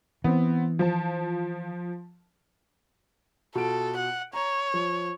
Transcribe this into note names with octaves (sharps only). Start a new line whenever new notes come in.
E3 B3 C4
F3 A5
B2 F4 A4 D7
F#5
C#5 A#5
F3